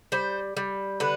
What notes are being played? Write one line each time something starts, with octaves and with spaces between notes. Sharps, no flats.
G3 C5
G3
D3 B4